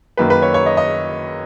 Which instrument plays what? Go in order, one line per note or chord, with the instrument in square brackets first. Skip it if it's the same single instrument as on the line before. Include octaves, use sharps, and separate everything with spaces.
[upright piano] F#2 D#3 A#3 B4
B4
C#5
C#5
D#5
D#5